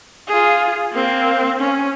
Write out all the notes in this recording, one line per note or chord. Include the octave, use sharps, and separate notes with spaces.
F4 G#4
A#3 C4
C#4